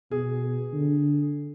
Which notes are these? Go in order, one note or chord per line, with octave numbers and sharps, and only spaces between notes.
B2 G#4
D3